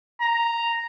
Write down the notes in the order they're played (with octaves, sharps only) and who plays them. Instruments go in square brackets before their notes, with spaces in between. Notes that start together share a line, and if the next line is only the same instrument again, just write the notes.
[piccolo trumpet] A#5